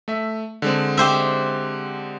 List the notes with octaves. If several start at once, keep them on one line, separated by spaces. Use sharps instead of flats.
A3 E5
D3 G#3 C4
G4 C5 E5